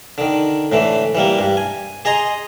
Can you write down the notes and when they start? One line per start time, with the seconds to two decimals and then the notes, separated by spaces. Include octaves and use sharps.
0.18 D3 D#3
0.72 A2 D3 E3
1.15 E3 G3 A#3
1.39 G2
1.57 G#5
2.05 G#4 D#5 G#5 A#5 C6